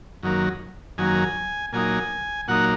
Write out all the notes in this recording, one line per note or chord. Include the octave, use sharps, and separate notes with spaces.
F#2 D#3 F#3 A#3
F#2 D#3 F#3 A#3 G#5
A#2 F#3 A#3 D#4 G#5
A#2 F#3 A#3 D#4 F#5